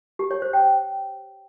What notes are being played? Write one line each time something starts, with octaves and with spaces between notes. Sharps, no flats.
G4
C#5
C5
G5